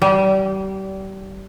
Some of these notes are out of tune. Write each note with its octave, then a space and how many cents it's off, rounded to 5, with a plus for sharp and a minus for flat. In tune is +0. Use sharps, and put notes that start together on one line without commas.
G3 -30